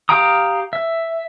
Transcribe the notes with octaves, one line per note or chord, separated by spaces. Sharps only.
G4 F5 G5 A#5 D#6
E5